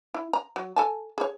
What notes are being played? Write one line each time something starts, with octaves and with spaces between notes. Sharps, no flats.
E4
A#5
F#3
A4 G#5 A5
G#4 C#5